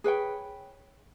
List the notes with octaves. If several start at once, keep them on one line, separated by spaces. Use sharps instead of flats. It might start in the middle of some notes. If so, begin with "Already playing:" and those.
G#4 B4 C#5 G5